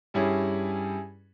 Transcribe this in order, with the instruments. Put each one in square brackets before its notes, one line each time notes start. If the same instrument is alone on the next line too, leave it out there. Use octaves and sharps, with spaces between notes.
[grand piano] G2 G3 C#4 E4 G#4